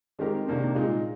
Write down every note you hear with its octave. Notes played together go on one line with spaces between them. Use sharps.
D#3 G#3 C4 G4 A#4
C3 D#3 A#3 D4
A#2 G#3 D#4